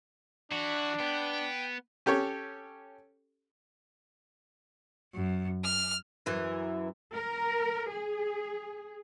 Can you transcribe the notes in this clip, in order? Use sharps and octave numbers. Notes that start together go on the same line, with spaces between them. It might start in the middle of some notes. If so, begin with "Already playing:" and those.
E3 D4 F#4
B3 G5
C#4 G4 A4 C#5
F#2
F6
F#2 E3
A#4
G#4